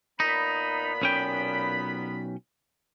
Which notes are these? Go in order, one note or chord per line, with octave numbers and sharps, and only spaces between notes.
A#2 B3 D#4 B5
B1 C#4 G5